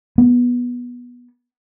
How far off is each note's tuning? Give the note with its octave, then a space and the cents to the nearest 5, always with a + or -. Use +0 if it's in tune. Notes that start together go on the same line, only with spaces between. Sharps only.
B3 -15